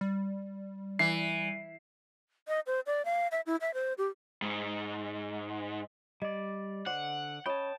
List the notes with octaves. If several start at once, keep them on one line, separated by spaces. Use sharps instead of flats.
G3
E3 C7
D#5
C5
D5
F5
E5
E4
E5
C5
G4
G#2
G3 D5 D#5
D3 C5 D5 F#5
C#4 C#5 D#5 G5 A5 B5